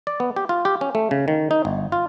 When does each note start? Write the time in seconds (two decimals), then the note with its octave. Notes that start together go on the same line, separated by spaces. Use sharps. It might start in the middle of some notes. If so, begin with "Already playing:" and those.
0.07 D5
0.20 B3
0.36 G4
0.49 F4
0.65 G4
0.81 C#4
0.95 A3
1.11 C#3
1.28 D#3
1.51 D#4
1.65 G1
1.92 F4